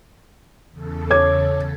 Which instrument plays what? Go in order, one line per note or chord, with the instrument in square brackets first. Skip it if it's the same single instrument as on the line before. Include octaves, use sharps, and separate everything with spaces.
[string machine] E2 C#3 A4
[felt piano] C#5 D6 G#6